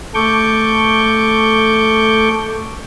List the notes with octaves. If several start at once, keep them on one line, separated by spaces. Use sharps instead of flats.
A3 A4 C#6 D6 G6